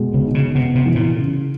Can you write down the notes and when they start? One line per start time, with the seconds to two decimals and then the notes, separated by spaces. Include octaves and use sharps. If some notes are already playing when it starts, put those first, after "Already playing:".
Already playing: B2 G#3
0.14 C#3
0.24 D#4
0.35 C#3
0.55 C3 B3
0.75 C3
0.86 E3
0.95 A#2
1.16 C#3